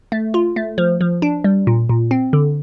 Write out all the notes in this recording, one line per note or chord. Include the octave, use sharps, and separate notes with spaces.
A3
F4
A3
F3
F3
D4
G3
A#2
A#2
C4
D3